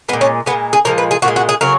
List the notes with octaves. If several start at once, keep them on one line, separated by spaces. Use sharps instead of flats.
A#2 G#3 B3
C#4
A#2 G#3 B3
G#4
A#2 F3 G#3 A#4
B4
G#4
A#2 F3 F#4
G#3
F#4
G#4
C#3 F#3 A#4